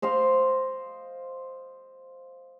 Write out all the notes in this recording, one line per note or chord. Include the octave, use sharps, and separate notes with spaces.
C5 D#5 F5 C6